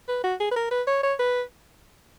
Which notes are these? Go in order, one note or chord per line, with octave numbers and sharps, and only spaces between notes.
B4
F#4
G#4
B4
A#4
B4
C#5
C#5
B4